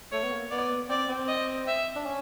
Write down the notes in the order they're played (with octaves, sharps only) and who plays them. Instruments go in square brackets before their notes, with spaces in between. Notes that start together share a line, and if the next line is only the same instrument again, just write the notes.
[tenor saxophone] A3 [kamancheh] C#5
[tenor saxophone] B3
A#3
[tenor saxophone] B3 [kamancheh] D5
[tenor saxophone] C4 [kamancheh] D5
[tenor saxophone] C4
[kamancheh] D#5
E5
[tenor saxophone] D4
C#4